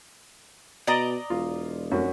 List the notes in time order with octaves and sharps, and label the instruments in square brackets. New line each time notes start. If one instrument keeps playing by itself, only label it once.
[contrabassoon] B2 [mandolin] D5 D#5 A#5
[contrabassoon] E1 [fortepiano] F4
[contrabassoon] F1 [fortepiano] F#2 C#4 F#4